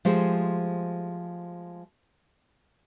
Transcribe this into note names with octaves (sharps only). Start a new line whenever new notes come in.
F3 G#3 A3 G4 G#4 C5